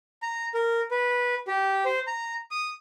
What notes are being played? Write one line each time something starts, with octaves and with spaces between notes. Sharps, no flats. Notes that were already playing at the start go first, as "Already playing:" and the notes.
A#5
A#4
B4
G4
C5
A#5
D#6